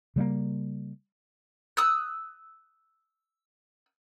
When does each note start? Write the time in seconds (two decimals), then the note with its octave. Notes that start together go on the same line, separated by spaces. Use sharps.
0.16 C#3 G3 A3 A#3
1.77 D#6 E6 F#6